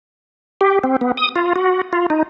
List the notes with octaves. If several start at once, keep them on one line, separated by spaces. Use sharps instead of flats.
G4
C4
B3
D#6
F4
F#4
F4
D#4